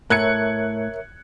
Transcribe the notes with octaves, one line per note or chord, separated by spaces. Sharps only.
A2 A#4 C#5 E5 F#6 G#6 C#7